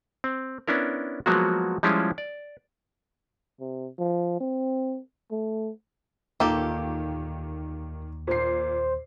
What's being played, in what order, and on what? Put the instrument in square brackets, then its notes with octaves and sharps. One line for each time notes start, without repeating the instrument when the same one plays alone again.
[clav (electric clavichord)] C4
B3 C#4 D4 E4 A#4
F3 F#3 G#3 A#3 B3 F#4
F3 G3 G#3 C#4 E4 F4
D5
[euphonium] C3
F3
C4
A3
[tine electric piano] D#2 [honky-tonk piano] A#2 D#3 [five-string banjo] A#3 G4 A4
[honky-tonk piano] A#2 C7 [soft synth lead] C5